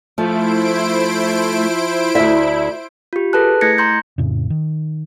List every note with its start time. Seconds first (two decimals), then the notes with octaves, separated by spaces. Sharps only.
0.18 F3 A3 E4 C5 D7
2.15 D2 E4 E5
3.13 F4 G4
3.33 G#4 A4 B4 A5 F#6
3.61 A3 E4 G#6 A#6 C#7
3.78 A#5 C6 G6
4.18 F2 A2 C#3
4.50 D#3